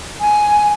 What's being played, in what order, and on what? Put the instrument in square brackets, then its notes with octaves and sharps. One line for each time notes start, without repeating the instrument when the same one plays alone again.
[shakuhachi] G#5